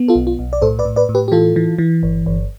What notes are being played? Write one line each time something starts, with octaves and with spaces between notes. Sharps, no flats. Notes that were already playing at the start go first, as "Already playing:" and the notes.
Already playing: B3
F4 A4
B1
F4
B1
D5
A2 A4 C5
B4 D5
A2
B4 D5
A2
G4 B4
G4
E3 F4 A4
E3
E3
G1
G1